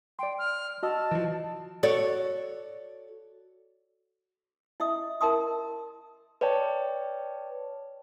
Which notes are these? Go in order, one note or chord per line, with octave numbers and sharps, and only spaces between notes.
D5 G5 C6
F6
F#4 D#5 A5 E6
E3 F3
F#4 A4 C#5 D5
E4 D#5 E5 D#6
E4 A#4 E5 A5 C6 D#6
B4 C#5 D5 G5 A5